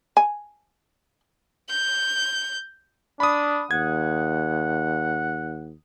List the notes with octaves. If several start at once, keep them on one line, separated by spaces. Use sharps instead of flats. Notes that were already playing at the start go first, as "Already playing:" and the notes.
G#5
G6
D4 B5 D#6
D#2 F#5 G#6